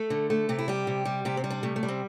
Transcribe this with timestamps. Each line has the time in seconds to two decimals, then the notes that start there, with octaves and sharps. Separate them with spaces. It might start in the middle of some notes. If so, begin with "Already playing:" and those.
Already playing: A3 A4
0.10 D3
0.30 A3
0.49 C3 G4
0.58 E4
0.68 G3 G4
0.87 C3
1.05 G3
1.25 C3 G4
1.37 C4
1.44 G3
1.50 D4
1.63 C3 A3
1.76 A3
1.83 G3
1.88 C4